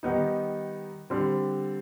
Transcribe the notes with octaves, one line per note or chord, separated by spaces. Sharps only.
D#3 G3 B3 D#4
D3 G3 C4